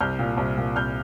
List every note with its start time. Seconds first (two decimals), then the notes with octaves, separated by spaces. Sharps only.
0.01 C2 F6 G6
0.19 A#2
0.37 C2
0.58 A#2
0.76 C2 F6 G6